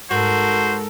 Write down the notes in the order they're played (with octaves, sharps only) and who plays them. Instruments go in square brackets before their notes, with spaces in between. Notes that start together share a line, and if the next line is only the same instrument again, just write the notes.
[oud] G#2 [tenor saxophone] F#4 [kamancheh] A4 A#4 [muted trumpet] C5